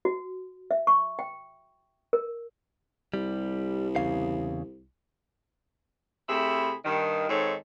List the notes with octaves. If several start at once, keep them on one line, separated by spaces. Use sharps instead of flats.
F#4
E5
C#6
G5
A#4
C2 G3
E2 C#3 F5
C3 A3 E4 G#4 B5
G2 D#3
G#2 D#3 C4 A4 C#5